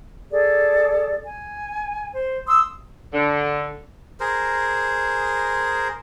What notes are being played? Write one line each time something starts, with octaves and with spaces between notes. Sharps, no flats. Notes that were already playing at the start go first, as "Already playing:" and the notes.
G#4 A4 D5
G#5
C5
C6 D#6 E6
D3
G#4 A#4 C5